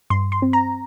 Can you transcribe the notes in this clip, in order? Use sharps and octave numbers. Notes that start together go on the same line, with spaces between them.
G2 C6
C6
C4
A#5